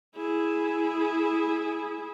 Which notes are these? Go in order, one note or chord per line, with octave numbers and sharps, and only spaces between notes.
E4 G#4